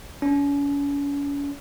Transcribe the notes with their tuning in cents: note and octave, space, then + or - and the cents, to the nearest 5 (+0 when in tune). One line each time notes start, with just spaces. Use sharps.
C#4 +40